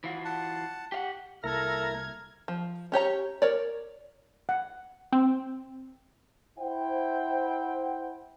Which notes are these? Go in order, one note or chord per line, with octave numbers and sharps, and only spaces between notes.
E3 F4 F#4
F#5 A5
G4 F5 F#5
C2 A#3 E4 A4 A#5 F6 G#6
F3
C#4 G4 C#5 A#5
A#4 C#5 D5
F#5
C4
E4 C5 F#5 G5